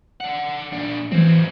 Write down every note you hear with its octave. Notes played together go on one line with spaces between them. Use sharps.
D5 F#5
A#2 D4
E3 F#3 C4